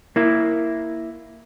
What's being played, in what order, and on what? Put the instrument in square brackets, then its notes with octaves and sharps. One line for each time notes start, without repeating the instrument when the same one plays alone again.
[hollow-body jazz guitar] A#3 E4